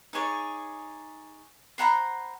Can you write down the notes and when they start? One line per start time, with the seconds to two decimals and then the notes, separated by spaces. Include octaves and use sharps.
0.13 D#4 G#4 C#5 D5
1.78 C5 F#5 A#5 B5